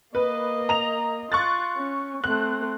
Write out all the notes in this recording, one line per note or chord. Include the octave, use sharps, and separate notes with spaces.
A#3 B4 D#5
A#5 F7
F4 C#6 F#6 A6
C#4
A3 C4 F#6